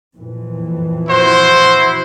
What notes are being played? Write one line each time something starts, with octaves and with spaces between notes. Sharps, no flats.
F2 A#2 E3
E4 F#4 C5